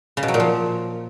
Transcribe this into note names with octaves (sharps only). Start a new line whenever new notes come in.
C#3
B2
F#3
A#2
F3